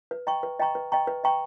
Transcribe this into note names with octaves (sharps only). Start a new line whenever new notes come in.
B4
D#5 G5 A#5 C#6
B4
D#5 G5 A#5 C#6
B4
D#5 G5 A#5 C#6
B4
D#5 G5 A#5 C#6